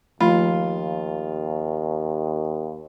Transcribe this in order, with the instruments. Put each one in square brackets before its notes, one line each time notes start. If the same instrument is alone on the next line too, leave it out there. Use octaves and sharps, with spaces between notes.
[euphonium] D#2 [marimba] F3 A3 B5 [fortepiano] F4